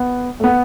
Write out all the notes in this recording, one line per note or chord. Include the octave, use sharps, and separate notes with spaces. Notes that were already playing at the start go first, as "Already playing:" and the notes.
Already playing: B3
A3
B3